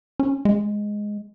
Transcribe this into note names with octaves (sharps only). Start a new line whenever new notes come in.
C#4
G#3